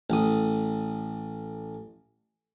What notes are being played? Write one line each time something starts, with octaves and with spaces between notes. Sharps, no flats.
A1 D#6